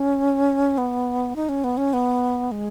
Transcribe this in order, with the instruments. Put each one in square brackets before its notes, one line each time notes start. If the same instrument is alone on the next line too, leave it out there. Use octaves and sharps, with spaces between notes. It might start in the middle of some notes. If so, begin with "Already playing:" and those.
Already playing: [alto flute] C#4
B3
D#4
C#4
B3
C#4
B3
G#3